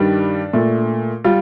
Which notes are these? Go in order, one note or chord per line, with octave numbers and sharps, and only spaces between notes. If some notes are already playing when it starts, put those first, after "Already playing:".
Already playing: G2 D#3 G3 D4
A#2 A3
G3 F4